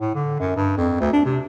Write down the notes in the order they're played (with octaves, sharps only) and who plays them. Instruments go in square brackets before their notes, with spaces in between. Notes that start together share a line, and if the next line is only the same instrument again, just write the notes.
[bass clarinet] A2
D3
F#2
G2
F2
D2
D4
C3